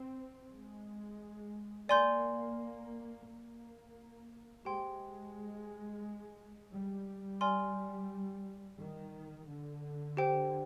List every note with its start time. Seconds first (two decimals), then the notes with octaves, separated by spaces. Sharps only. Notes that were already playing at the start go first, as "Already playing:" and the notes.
Already playing: C4
0.51 G#3
1.89 A#3 D5 G#5 C6 G6
3.27 A#3
4.65 G#3 G4 C5 G5 C6
6.72 G3
7.41 D5 G#5 C6 F6
8.79 D#3
9.48 D3
10.17 G4 C5 G5